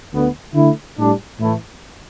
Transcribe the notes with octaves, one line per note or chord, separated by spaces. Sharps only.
D2 D3 B3
D3 A3 E4
A2 G3 D4
A2 E3 A3 E4